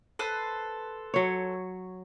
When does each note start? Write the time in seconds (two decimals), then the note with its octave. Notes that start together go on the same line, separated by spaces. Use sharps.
0.19 A4 B4 C5
1.14 F#3 C#5